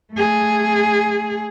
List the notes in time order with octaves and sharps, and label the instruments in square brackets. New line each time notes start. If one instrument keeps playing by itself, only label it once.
[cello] A3 G#4